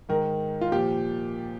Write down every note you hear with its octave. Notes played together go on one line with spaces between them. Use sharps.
G#2 D#3 A#4
F4
A#2 F3 G4